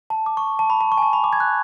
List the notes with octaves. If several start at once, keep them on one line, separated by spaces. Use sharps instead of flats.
A5
D6
C#6
A5
B5
A5
C#6
G#5
A5
B5
D6
G#6
F#6